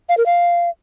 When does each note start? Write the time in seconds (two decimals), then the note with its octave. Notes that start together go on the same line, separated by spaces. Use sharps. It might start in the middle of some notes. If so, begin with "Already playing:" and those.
0.09 F5
0.17 A#4
0.26 F5